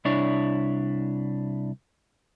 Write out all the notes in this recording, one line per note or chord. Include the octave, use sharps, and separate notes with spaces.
C2 D4 E4 C#5